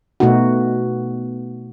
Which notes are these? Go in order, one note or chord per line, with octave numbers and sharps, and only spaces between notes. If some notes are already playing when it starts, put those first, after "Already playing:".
B2 A3 B3 D#4 F#4